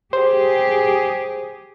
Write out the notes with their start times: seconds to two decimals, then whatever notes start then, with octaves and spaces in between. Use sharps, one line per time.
0.13 G4 G#4 C5